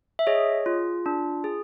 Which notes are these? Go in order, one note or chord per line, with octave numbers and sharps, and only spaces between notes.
E5
G#4 C#5 D#5
F4
D4
G#4